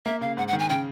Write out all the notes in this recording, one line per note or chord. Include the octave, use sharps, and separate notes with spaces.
A#3 E5
C#3 F5
G#2 F#5
F#5
D#3
G#5
C#3 G5